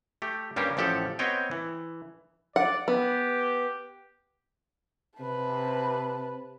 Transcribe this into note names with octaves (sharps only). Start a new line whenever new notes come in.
A3 G4
G2 G3 A#3 C#4 G4
A1 F3 G4 A4 F#5
B3 C4 C#5 D#5 G5
E3
D5 F#5
B3 G4
C3 B4 A5